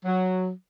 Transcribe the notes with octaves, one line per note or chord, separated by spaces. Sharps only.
F#3